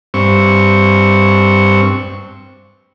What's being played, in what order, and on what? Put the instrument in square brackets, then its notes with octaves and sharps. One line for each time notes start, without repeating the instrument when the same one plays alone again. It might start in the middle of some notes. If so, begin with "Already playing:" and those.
[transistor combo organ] G2 C4 C#6